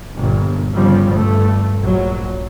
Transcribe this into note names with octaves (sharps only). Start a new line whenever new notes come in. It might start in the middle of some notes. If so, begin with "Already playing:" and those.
G1 A#2
G1 C#3 F3 G3
G2 A3
A#1 F#3